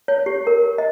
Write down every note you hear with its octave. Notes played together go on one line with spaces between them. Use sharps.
C#5
G4
A#4
D#5